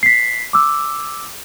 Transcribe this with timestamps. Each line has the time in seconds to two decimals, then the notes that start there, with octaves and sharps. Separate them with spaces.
0.03 B6 C7
0.53 D6 E6